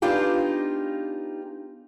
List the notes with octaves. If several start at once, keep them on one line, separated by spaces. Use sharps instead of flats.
B3 D4 D#4 F4 G4 G#4